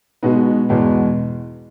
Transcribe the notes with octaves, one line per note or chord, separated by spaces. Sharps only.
B2 G#3 B3 D#4 F#4
E2 B2 G#3